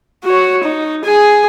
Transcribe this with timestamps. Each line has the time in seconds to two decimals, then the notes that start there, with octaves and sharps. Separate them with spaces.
0.24 F#4 C#5
0.64 D#4
1.05 G#4 G#5